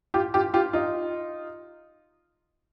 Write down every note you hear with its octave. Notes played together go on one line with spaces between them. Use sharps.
F4 G4
F4 G4
F4 G4
D#4 F4